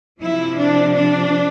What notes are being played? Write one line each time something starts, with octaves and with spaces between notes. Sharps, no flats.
C3 F3 E4
D4
D4